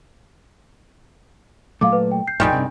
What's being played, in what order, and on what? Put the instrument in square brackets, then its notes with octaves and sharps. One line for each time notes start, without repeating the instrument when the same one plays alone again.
[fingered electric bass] A#2 F#3 A3 [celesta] F5 D6
[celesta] B4
G5
G6 C7
[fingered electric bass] B1 F2 A2 [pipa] D#3 G3 G#3 [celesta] G6
[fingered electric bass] G2 C3